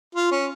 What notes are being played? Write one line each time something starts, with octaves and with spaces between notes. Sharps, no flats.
F4
C#4